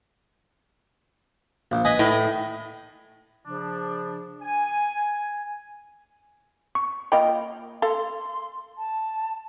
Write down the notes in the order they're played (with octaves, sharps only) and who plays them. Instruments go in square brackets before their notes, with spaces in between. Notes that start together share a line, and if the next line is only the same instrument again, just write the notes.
[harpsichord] A#1
B4 D#5 G#5
[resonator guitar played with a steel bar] A2
[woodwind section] C#3 F3 D4
G#5
[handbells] C#6
[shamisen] A#3 F4 B5 [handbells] D#5 G5
[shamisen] A4 F5 [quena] C6
[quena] A5